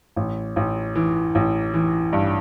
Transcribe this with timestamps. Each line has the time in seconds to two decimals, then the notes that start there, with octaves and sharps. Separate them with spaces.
0.16 A1
0.56 A1
0.95 E3
1.35 A1
1.74 E3
2.13 G2